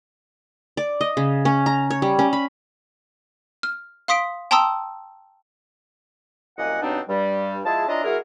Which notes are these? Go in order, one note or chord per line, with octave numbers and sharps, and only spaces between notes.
D5
D#5
C#3
C#4
A#5
C#5
G3
C#4
B5
F6
F5 C6 D#6 B6 D7
G5 A5 A#5 C6 D#6 E6
C2 F#2 A#3 D#5 F#5 G#5
G2 B2 F#3 C4 D4 D#4
G2 G3
F3 G#3 E4 G#4 A5
C#4 D4 E4 F4 D#5 A#5
G#3 E4 F#4 G#4 A#4